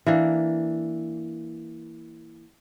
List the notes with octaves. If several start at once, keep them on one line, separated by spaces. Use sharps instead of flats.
E3 A#3 D4